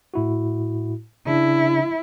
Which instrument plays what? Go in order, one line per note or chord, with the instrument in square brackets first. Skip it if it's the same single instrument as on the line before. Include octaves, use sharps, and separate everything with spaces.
[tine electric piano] A2 E4 F#4
[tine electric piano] C#3 D4 [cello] E4